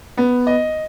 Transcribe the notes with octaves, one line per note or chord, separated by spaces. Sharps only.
B3
D#5